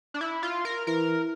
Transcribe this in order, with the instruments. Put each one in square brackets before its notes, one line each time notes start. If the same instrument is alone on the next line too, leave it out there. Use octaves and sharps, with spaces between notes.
[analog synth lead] D4
E4
F4
A#4
[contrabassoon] E3 [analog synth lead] A#4